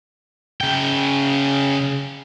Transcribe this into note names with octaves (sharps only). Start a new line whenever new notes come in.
C#3 G5